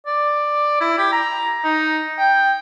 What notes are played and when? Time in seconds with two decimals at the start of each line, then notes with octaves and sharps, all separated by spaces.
0.06 D5
0.81 E4
0.98 G4
1.12 A#5
1.64 D#4
2.18 G5